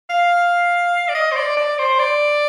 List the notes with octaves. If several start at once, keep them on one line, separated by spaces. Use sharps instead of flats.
F5
D5
D#5
C5
D5
D5
C5
D5